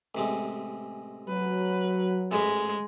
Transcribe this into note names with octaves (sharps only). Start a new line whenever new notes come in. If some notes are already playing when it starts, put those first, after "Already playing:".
A1 C3 G#3
F#3 B4
A1 G#2 G#3 B5